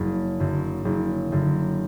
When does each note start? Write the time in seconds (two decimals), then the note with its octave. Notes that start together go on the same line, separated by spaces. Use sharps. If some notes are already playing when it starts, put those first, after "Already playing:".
Already playing: F#1
0.40 F#2 D3
0.85 F#1
1.32 F#2 D3